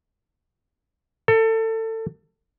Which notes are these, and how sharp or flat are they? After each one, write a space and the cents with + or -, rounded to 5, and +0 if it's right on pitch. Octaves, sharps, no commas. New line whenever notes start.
A4 +25